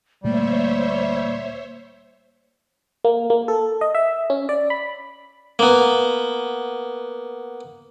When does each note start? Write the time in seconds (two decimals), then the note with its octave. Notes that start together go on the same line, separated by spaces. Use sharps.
0.24 D2 A#2 G3 A3 A#3 C5 C#5 E5
3.04 A#3
3.30 A#3
3.48 A4
3.81 D#5
3.95 E5
4.30 C#4
4.49 D5
4.70 B5
5.59 A#3 B3